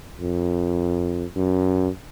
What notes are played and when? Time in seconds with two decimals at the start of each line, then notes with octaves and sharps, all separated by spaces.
0.20 F2
1.36 F#2